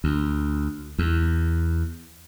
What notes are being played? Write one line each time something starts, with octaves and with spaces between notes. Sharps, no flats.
D2
E2